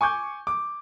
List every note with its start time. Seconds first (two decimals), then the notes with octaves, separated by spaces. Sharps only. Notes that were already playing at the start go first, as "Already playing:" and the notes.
0.01 G#5 C#6 D6 G6
0.47 D6